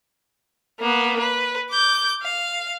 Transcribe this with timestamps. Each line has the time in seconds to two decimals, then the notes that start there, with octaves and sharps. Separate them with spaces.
0.80 A#3 B3
1.19 B4
1.71 D6 G6
2.22 F5